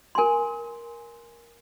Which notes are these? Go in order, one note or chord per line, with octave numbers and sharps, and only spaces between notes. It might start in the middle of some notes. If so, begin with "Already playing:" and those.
A#4 G#5 C6